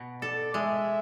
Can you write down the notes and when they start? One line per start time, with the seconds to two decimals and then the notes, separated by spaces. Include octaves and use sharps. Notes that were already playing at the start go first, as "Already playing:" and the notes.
Already playing: B2
0.22 A4 D5
0.54 G#3 E5